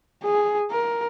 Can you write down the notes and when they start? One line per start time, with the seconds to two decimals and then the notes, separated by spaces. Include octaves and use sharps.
0.24 G#4
0.71 A#4